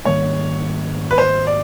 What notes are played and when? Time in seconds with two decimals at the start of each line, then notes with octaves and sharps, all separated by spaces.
0.05 G#2 D#3 G3 A#3 C#5
1.11 B4
1.18 C5
1.47 D5